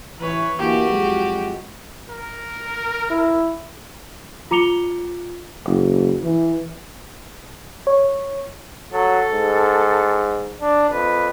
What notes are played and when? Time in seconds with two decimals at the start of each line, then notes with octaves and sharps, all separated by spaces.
0.20 A1 E3 B4 C#5
0.58 D2 E3 A#3 F#4 G4
0.88 F2 F#3 G#3
2.10 A#4
3.10 E4
4.51 F4 A#5 D6 C#7 F7 G7
5.67 F#1
6.24 E3
7.87 C#5
8.92 F#3 A4
9.32 G#2
10.60 D4
10.90 F2 B4